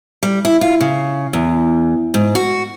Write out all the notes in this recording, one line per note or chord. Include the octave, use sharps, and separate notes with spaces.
G3
E4
F4
C#3
E2
G#2
F#4